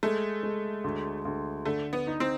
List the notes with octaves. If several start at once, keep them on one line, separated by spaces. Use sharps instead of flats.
G#3 A3
G#3
D2
D2
D3 A3
B3
D#4
C4